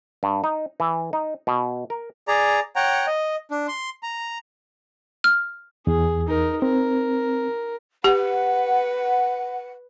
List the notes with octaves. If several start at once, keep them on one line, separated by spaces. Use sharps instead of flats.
G2
D#4
E3
D#4
B2
A#4
G#4 D5 A#5
C#5 F#5 G5 A#5
D#5
D4
C6
A#5
F6
E2 G#4
D#4 A#4
C4 A#4
G4 B4 F#5